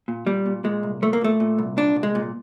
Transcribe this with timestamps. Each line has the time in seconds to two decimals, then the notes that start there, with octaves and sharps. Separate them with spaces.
0.08 A#2
0.27 A#2 G3
0.46 A#2
0.64 A#2 G#3
0.83 C2
1.02 A#2 A3
1.13 A#3
1.21 A#2 A3
1.40 A#2
1.58 C2
1.77 A#2 D4
1.96 C2
2.03 G#3
2.15 A#2